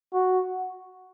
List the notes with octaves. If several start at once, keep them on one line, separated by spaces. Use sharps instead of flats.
F#4